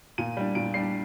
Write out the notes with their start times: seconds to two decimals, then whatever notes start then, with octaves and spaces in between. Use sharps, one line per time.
0.18 A#2 D#7
0.37 G3 D4
0.55 A#2 D7
0.74 G3 D4 C7